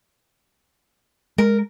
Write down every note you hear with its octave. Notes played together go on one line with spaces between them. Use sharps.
G#3 A#4